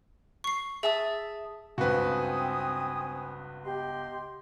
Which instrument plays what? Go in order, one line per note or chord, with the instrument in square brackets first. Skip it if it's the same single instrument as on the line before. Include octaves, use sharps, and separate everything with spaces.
[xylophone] C#6 C7
[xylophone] G#4 [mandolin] E5 A5 D#6
[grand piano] C#2 G2 [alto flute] C4 [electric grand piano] F#4 B4 [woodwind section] G#5 D#6
[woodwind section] B3 D#5 C6 [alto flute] G4